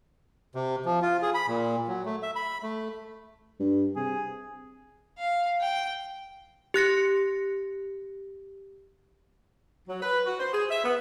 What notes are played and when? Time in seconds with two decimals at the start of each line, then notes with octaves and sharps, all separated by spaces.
0.55 C3
0.85 F3
1.02 F4
1.22 G#4
1.34 B5
1.48 A#2
1.88 F#3
2.06 A3
2.23 E5
2.36 B5
2.63 A3
3.60 G2
3.96 C3 G#4
5.18 F5
5.61 G5
6.74 G4 F#6 A#6 C#7
9.88 F#3
10.02 B4
10.26 F#4
10.38 C5
10.53 G#4
10.70 E5
10.84 B3